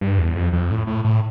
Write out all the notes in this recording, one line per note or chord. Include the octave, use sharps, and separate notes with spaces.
G2
E2
F2
F2
A2
A2
A2